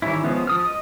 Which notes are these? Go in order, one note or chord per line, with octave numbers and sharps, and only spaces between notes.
D#3 E3 G3 C#4 E4
F3 G#3 B3 C#4
F3 D#6 F6
D#5